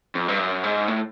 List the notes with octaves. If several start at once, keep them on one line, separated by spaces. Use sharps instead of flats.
F2
G2
F#2
G#2
A2